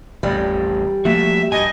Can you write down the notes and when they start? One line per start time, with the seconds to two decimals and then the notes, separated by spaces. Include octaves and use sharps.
0.23 A1 F2 G3
1.05 F3 A3 A#3 F#4 E5
1.52 G2 D#5 G#5